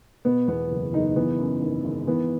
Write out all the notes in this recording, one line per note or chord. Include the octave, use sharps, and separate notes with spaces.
B2 B3
E2 B3
F#1
F#1 D#4
E3 B3
F#2
G#1
G#1
E3 B3